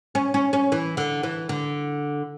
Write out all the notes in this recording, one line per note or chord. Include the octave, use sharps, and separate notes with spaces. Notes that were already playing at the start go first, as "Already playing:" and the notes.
C#4
C#4
C#4
E3
D3
E3
D3